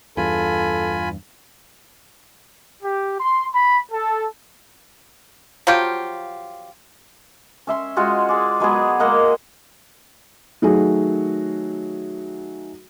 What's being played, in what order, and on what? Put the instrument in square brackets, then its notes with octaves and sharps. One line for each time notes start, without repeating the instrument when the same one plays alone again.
[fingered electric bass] E2 G2 [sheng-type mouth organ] F4 G#5 B5 [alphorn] A4
[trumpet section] G4
C6
B5
A4
[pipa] F3 F#3 F4 G4
[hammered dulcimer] C#4 E5 C6
G#3 F4 F#4 G#4
G#4 D5
F#3 G#3 B3 G#4
G#3 A#3 D#5 F#5
[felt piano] D#3 F#3 A3 F#4 G#4